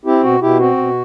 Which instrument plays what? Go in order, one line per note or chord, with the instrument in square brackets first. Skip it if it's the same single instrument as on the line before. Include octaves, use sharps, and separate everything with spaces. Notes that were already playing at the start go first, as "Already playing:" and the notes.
[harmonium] C4 E4 G4
B2 F#4
B2 E4 G4
C4 F#4
B2